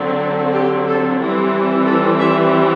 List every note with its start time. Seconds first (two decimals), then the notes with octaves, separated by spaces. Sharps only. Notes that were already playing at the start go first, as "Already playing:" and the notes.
Already playing: D3 F#3 C4
0.53 G4
0.87 A4
1.19 E3 G3 C4
1.85 A4
2.18 E5